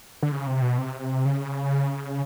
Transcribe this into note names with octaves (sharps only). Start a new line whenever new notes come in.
D3
C#3
C3
B2
C3
C#3